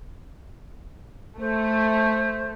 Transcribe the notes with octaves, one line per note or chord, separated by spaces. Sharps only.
A3 C5